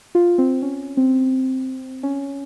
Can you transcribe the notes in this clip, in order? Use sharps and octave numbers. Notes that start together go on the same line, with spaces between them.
F4
C4
C#4
C4
C#4